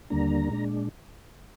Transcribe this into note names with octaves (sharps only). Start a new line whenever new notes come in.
D#2 D3 G3 A#3 D4 A#5
A#2 G#3 D4